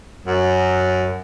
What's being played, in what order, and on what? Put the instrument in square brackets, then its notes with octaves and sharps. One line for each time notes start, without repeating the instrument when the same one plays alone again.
[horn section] F#2